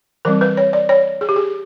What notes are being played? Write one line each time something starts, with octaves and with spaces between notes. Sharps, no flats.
E3 G3 C4 A#4
B4
C#5
D5
C#5
G#4
G4
G#4